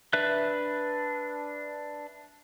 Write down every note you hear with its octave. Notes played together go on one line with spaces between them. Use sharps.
D4 B4 E5 F#6